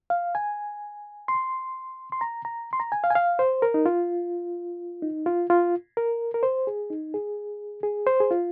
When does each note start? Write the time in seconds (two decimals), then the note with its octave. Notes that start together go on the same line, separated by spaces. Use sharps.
0.10 F5
0.35 G#5
1.28 C6
2.12 C6
2.21 A#5
2.45 A#5
2.73 C6
2.80 A#5
2.92 G#5
3.04 F5
3.10 G#5
3.15 F5
3.39 C5
3.62 A#4
3.74 D#4
3.86 F4
5.02 D#4
5.26 F4
5.50 F4
5.97 A#4
6.34 A#4
6.43 C5
6.67 G#4
6.90 D#4
7.14 G#4
7.83 G#4
8.07 C5
8.20 G#4
8.31 F4